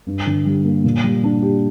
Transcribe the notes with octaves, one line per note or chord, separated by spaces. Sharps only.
G2
D3
G3
A#3
A#2
G3
D4
G4